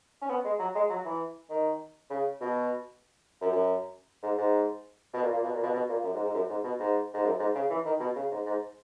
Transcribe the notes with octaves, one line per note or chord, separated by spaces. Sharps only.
C#4
B3
G#3
F#3
G#3
F#3
E3
D#3
C#3
B2
F#2
F#2
G#2
G#2
B2
A#2
A#2
B2
A#2
B2
B2
A#2
F#2
G#2
G#2
F#2
G#2
B2
G#2
G#2
F#2
G#2
C#3
E3
D#3
B2
C#3
G#2
G#2